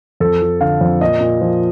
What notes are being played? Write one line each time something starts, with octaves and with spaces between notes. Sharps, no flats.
F2 A4
F3
D3 F5
F2
A#2 D#5
A#2
F3